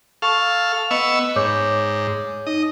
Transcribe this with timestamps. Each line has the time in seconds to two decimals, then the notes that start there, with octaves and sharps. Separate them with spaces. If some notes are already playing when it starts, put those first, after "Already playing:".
0.22 A4 F5 C#6
0.91 B3 D#5 C#6 E6
1.36 G#2 C#5 D6 G6
2.47 D#4 D#5